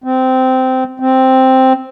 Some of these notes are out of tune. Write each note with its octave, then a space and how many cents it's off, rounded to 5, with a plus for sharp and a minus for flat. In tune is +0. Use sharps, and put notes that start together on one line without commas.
C4 -15
C4 +0